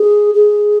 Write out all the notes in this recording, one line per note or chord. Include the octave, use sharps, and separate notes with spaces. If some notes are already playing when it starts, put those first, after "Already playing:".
Already playing: G#4
G#4